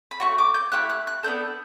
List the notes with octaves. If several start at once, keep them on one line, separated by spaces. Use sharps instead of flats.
B5
A3 C#4 F#4 C#6
D6
G6
A3 E4 G4 F#6
F#6
F#6
B3 D4 A4 G6